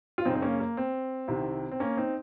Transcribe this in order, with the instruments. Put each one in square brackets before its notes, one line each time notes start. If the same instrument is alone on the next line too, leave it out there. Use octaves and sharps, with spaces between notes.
[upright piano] F4
F#2 C#3 C4 D#4
C4
A#3 C#4
A#3
C4
C2 C3 D#3
C4
A#3 C#4
C4 D#4